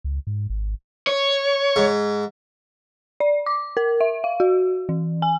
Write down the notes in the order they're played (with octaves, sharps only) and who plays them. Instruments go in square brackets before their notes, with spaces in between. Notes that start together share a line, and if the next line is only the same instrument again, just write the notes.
[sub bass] C#2
G#2
G#1
[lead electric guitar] C#5
[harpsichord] G#2
[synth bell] D5
D6
A#4
E5
F5
F#4
E3
G#5